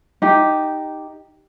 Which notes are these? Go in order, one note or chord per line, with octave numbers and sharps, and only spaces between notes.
D#4 G4